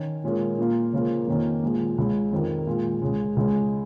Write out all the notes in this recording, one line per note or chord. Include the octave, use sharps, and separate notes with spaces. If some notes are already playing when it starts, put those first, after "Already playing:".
Already playing: D#3 C#4
A#2 G#3 C#4 F4 A#4
A#2 A#3 F4
C#3 F3 A#3 F4 A#4
F2 D#3 A#3 C#4
A#2 F3 G#3
C#2 C#3 G#3
F2 D#3 C#4 A#4
A#2 G#3 F4
C#2 C#3 G#3
C#2 C#3 G#3